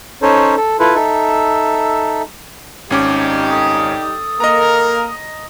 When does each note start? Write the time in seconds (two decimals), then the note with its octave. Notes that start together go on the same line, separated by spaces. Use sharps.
0.22 C#4 D#4 A4 C5 C#5
0.57 A4
0.80 E4 F4 A4 B4
0.95 D#4 A4 E5
2.90 G#1 G3 C#4 D#4 G4 D6
3.50 A4 D#6
4.40 A#3 A#4 D#5 A#5